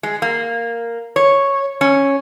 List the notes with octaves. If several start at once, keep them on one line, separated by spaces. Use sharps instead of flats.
G#3
A#3
C#5
C#4